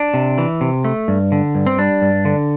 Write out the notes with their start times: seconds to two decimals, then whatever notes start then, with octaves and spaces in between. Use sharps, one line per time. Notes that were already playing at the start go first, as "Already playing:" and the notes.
Already playing: D4
0.14 C3
0.38 E3
0.61 C3
0.84 A3
1.08 G2
1.32 D3
1.55 G2
1.66 C4
1.78 G3 D4
2.02 G2
2.25 D3